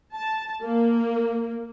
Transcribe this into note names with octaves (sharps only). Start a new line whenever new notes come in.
A5
A#3